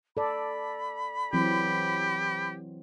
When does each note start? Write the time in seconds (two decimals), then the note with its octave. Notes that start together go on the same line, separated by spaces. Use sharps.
0.17 A4 D5 B5
1.33 E3 F#3 C4 G4